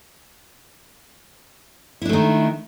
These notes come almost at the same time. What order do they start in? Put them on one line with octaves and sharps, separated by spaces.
E4 D4 A3 D#3